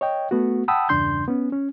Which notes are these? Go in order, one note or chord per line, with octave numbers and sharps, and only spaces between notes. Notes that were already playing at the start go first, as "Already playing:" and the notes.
C#5 D#5 G5
A3 B3 F#4
F#5 G5 A5 B5 D#6 E6
E2 G2 C#3 D4 C6 G6
B3 C#4
C#4